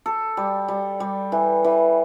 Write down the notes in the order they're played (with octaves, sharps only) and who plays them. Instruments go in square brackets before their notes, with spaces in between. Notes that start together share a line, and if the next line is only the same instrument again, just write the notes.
[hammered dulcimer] A4
G3
G3
G3
E3
E3